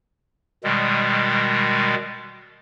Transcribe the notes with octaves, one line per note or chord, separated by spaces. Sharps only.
B2 D#3 G3 G#3